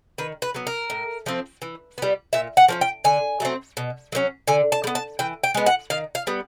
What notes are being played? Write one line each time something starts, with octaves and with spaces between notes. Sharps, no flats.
D#3 B4
B4
F#3 B3
A#4
A2
F3 A3 C4
E3
G3 B3
A#2 E5
F#5
F3 A#3 C#4
G5
D3 G#5
F#3 A3 C4
B2
F#3 A#3 C#4
D3 G#5
A5
G3
B3
A5
E3 G5
G5
G#3 B3
F#5
D#3 F5
F5
G3 B3